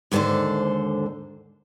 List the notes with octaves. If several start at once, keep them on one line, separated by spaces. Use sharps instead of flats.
D#2 G#2 D3 A4 C5